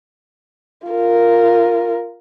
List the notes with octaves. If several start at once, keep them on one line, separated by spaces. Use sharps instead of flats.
F4 A#4